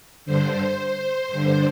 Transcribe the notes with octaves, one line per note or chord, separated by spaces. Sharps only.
G2 D3 C5
G2 D3